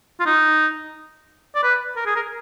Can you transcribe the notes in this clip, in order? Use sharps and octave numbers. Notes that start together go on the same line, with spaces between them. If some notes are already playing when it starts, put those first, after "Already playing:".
F4
D#4
D5
B4
A#4
G#4
A#4